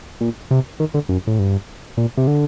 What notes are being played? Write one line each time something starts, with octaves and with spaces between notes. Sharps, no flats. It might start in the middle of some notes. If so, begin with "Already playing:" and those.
A#2
C3
D#3
D3
F#2
A2
G2
A#2
C3
D3